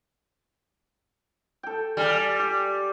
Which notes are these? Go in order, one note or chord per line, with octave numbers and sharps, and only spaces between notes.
A4 G5
G3 F5 G#5
G4